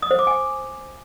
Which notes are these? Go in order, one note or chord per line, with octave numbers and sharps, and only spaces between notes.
D#6
C5
D6
G#5